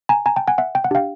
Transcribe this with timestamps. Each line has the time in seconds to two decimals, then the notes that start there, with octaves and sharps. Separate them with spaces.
0.09 G#5 A#5
0.26 G#5 A#5
0.36 G5 A5
0.48 F#5 G#5
0.58 E5 F#5
0.75 G5
0.84 F#5
0.91 D4 G4 F5 G5